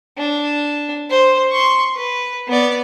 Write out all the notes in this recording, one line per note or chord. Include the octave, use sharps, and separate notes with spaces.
D4
C5
C6 C#6
B4
B3 D5